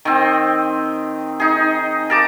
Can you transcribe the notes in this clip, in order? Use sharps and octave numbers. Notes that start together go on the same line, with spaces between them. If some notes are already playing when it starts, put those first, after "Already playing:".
D#3 C4
D#4 G#4
A#4 A5 D6